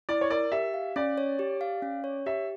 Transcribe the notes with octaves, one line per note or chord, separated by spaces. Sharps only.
E4 D5
C#5
A#4 D5
G4 E5
F5
C#4 D5
C#5
G4
F5
C#4
C#5
G4 E5